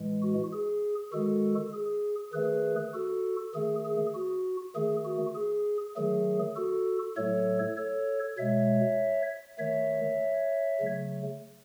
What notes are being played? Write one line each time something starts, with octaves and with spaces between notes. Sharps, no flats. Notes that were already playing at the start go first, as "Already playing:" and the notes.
Already playing: A2 E3 G#3
F#4
G#4
D#3 G#3 F#4 A4
G#4
D#3 A3 G#4 B4
F#4 A4
D#3 A3 G#4
G#4
F#4
D#3 A3 G#4
F#4
G#4
D#3 F#3 A3 G#4
F#4 A4
A2 F#3 A3 A4 C#5
A4 C#5
B2 G#3 C#5 E5
D#3 A3 C#5 E5
C#3 F#3 A3